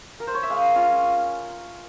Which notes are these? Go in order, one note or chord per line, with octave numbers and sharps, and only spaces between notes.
A#4
C5
C#5
E5
G#3 F5
C#4 F4